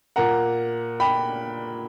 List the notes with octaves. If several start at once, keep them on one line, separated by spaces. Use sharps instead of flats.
A#2 A#3 F#5 A#5
G5 B5